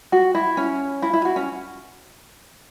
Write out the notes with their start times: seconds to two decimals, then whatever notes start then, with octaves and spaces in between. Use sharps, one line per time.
0.12 F#4
0.35 E4
0.57 C#4
1.02 E4
1.13 E4
1.25 F#4
1.36 C#4